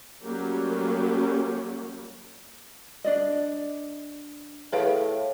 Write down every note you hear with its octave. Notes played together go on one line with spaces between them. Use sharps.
F#3 G3 A3 A#3 C#4 G4
D4 D5 D#5
A2 G#4 B4 F5 G5